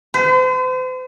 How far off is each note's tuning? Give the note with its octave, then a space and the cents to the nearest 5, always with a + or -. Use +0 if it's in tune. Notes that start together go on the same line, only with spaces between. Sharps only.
C5 -40